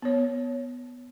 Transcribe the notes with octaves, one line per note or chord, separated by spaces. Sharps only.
B3 C#5